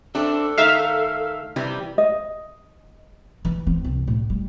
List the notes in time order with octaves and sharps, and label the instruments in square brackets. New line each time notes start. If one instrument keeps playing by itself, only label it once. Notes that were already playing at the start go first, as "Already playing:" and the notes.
[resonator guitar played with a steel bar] A3 C4 D4 [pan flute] A4
[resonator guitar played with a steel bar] D#3 A3 D#4 [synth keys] E5 F5
[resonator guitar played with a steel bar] C3 E3 G3
[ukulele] D#5
[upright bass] E3
C4
C2
A2
G3